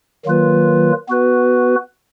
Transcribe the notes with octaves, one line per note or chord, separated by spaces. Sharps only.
D#3 F#3 A#3 F4 B4
B3 F#4 B4